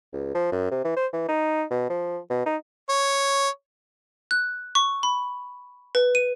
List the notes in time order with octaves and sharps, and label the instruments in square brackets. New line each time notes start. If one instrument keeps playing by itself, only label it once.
[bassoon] C#2
F3
F#2
C3
E3
C5
E3
D#4
B2
F3
B2
D#4
[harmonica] C#5
[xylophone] F#6
C#6
B5
B4
D#7